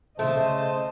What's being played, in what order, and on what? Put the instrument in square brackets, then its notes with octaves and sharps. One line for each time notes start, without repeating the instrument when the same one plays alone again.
[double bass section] C#3 [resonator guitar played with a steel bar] A3 [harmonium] C5 A5 [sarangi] D#5